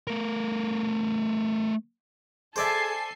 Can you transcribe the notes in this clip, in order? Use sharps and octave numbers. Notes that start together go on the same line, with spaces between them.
A3 A#4
G#4 A4 C5 D5 E5 G#5 A5 C7